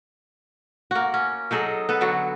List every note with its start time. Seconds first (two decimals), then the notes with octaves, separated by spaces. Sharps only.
0.91 A#3 F#4
1.14 C#4
1.51 F#3 D#4 G#4 A4
1.89 B3 A4 B4
2.01 D3 F#3 F#4